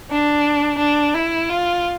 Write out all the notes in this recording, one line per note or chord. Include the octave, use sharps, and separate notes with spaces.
D4
D4
E4
F4